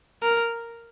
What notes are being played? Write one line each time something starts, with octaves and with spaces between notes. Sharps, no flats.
A#4